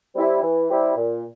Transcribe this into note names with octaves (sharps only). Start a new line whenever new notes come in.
G3 C4 E4 G4
E3
G3 C4 E4 G4
A#2